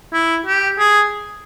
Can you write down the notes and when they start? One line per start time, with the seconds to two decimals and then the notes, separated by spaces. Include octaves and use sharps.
0.13 E4
0.46 G4
0.79 G#4